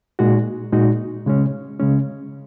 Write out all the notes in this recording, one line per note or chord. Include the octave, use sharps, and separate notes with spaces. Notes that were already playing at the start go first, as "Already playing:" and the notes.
A#2 G#3 D#4 F#4
A#2 G#3 D#4 F#4
C#3 G#3 C#4
C#3 G#3 C#4